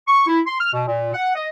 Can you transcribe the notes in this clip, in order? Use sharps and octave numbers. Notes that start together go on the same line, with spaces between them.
C#6
E4
C6
F6
B2
A#2
F#5
D#5